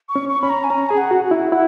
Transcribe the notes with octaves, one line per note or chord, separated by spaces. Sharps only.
C#6
C#4
C#6
C#4 B5
A#5
G#5
C#4 A#5
G#4 G#5
F#5
F#4
F#5
E4
E4 F#5